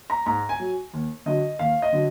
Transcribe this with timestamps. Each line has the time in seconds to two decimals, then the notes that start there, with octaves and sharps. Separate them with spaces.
0.10 A#5
0.26 G#2 A#5
0.49 G#5
0.60 F#3
0.93 D#2
1.26 D3 F#3 D#5
1.59 D#2 F5
1.82 D#5
1.93 D3 F#3